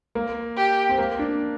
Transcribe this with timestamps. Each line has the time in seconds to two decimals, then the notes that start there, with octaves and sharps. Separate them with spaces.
0.15 A#3
0.57 G4
0.89 C4
0.98 A#3
1.19 D4